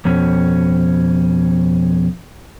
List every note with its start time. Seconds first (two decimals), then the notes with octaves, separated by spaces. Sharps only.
0.05 F2 B2 C#4